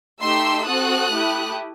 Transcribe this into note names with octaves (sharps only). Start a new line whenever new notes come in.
A3 D#4 G4 C6 E6
C4 F#4 A4 D#6 F#6
A3 E4 G4